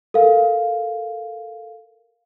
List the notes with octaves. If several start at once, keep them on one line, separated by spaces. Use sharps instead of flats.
A4 A#4 F5